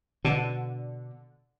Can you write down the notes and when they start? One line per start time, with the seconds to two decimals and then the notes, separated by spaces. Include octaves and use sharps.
0.25 B2 D3